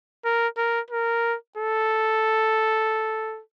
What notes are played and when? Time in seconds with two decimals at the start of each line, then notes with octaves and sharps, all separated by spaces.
0.25 A#4
0.57 A#4
0.90 A#4
1.57 A4